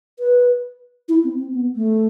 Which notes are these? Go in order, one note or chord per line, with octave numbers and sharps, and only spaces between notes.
B4
E4
C4
C4
B3
A3